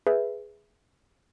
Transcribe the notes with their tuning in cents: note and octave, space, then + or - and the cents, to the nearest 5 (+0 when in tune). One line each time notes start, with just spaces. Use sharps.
G#4 +0 B4 +0 E5 +0